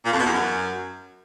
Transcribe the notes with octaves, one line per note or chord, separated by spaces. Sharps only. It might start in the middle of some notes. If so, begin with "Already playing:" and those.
A#2
F2
B2
E2
F#2